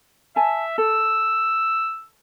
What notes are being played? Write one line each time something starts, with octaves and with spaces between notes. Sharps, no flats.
E5 G#5 A5
A4 E6